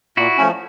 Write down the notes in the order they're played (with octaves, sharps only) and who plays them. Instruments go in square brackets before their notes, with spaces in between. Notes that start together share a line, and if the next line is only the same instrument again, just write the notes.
[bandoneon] A#2 [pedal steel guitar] E4 F#4
[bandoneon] F3 A3 C#4